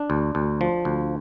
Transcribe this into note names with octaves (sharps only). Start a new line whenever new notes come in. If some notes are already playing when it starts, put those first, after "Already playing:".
Already playing: D4
D2
D2
F3
D2